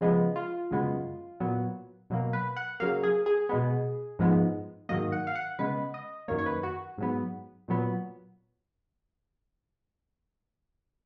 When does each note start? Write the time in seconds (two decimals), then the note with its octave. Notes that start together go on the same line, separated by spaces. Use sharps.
0.01 C#3 F3 G#3 B3
0.36 F4
0.71 F#2 C#3 G#3 B3
1.40 A#2 F#3 B3
2.10 B2 F#3 A#3
2.33 B4
2.56 F#5
2.80 C#3 F#3 A#3 F5
3.03 G#4
3.26 G#4
3.49 B2 G#3 B3
4.19 G#2 F3 G#3 B3
4.89 G#2 D#3 F#3 A#3 D#5
5.12 F#5
5.27 F5
5.35 F#5
5.59 C#3 G#3 B3 B4
5.94 D#5
6.28 F#2 D#3 A#3 C#5
6.38 C#5
6.46 B4
6.63 F#4
6.98 G#2 F#3 B3
7.68 A#2 F#3 B3